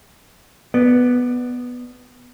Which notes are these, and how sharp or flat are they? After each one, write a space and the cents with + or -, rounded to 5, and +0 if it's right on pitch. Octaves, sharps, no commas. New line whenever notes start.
B3 +0 D5 +15